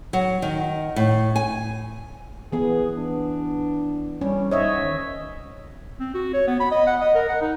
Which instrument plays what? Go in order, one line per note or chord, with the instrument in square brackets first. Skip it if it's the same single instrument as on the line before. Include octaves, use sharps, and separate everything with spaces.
[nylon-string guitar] F#3
D#3
A2
G#5
[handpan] E3 B3 [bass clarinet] G#4
[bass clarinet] D4
[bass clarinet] G3 [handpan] C#4
[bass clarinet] G#2 [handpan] C#5 D#5 E5
[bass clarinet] D#3
[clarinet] C4
F#4
C#5
B3
B5
D#5
F#5
D#5
A#4
F#5
D#4